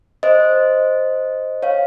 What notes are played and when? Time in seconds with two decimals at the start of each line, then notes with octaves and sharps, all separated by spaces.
0.23 C5 D#5
1.63 C#5 F5